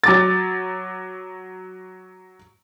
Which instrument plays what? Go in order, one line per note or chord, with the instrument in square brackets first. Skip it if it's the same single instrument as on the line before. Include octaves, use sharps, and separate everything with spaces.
[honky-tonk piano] F#3 D6 A6